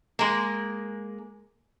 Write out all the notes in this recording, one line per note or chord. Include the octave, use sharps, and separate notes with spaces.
G#3 A#3